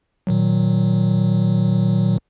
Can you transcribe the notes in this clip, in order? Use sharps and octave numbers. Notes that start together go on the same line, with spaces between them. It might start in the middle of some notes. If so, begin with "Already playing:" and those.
A#2 D#3 F#3